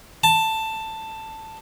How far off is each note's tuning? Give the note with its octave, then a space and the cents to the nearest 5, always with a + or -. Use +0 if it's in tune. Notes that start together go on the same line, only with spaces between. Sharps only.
A5 +10